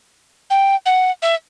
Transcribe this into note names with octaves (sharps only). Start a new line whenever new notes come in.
G5
F#5
E5